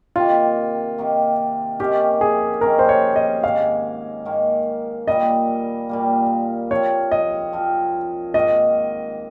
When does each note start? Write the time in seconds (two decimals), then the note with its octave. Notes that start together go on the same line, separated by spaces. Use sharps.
0.16 C3 D#3 A#3 F4
0.98 C3 D#3 A#3
1.80 C3 D#3 A#3 C#4 G4
2.21 G#4
2.61 C3 D#3 A#3 C#4 A#4
2.79 C5
2.89 C#5
3.16 D#5
3.43 G#2 D#3 A#3 F5
4.25 G#2 D#3 A#3
5.07 A#2 G3 A#3 D#5
5.89 A#2 G3 A#3
6.71 F3 C4 F4 C#5
7.11 D#5
7.53 F3 C4 F4
8.34 G#2 D#3 A#3 D#5